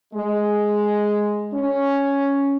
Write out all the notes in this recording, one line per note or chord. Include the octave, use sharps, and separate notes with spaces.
G#3
C#4